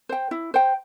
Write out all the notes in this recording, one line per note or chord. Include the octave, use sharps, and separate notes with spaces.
C5 G5
E4
C5 G5